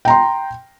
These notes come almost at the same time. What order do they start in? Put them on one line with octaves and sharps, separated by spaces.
G5 A#5 C6